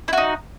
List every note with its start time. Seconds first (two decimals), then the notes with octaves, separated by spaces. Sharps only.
0.08 E4
0.13 F#4
0.17 D#4